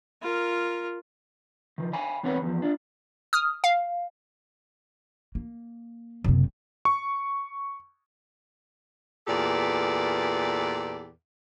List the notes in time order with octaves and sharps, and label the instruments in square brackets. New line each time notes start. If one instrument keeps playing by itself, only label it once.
[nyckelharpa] F4 A#4
[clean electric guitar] D#3 F3
F5 G5 G#5 B5
E2 C4 B4 C#5 F#5 B5
E2 F3
D4 F4
[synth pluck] D#6 F6
F5
[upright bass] A#3
F#1 C3
[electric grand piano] C#6
[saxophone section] E2 A#2 G4 A4 B4 D5